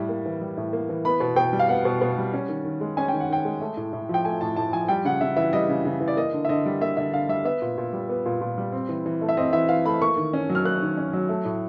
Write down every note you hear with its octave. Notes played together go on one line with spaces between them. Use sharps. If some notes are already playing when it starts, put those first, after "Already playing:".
Already playing: A2 G3
A#3
E3
G3
A2
A#3
E3
B3 B5
B2
B2 G5
G3
F5
B3 F#5
B2
B2
G3
C#4
D#3
D#3
G#3
C#4 G#5
D#3 G5
F#5
D#3 G5
G#3
A3
A2
A2
F3 G5
A3 G#5
A2 A5
A2 A5
F3 G#5
G3 G5
C#3 F#5
C#3 E5
E3 E5
G3 D#5
C#3
C#3
E3
D5
A#3 D#5
D3
E5
D3 D#5
G3
A#3 E5
D3 E5
D3 F5
G3 E5
B3 E5
A#2
A#2
G3
B3
A#2
A#2
G3
C4
E3
E3
A3
E5
C4 D#5
E3 E5
E3 F5
A3 B5
A#3 C#6
D#3
C#4
F#3
F6
A#3 F#6
D#3
C#4
F#3
A3
A2